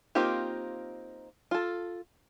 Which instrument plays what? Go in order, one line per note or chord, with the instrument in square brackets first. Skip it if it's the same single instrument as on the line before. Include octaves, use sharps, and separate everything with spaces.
[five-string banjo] A#3 C4 D#4 F4 G4
F4 A4